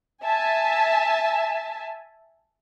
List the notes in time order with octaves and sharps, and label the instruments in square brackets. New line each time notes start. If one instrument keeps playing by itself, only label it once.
[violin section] E5 G#5 A5